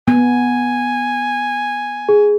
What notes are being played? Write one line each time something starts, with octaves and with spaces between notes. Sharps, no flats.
B3 G#5
G#4